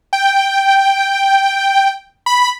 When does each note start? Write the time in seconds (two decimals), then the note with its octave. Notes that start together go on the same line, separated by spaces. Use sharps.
0.13 G5
2.26 B5